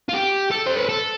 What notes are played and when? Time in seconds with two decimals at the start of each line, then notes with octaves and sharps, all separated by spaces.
0.09 F4
0.13 G4
0.51 A4
0.66 C5
0.77 B4
0.89 A4